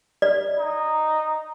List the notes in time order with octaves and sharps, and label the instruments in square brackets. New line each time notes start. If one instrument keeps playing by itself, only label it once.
[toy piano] D5
[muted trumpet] D#4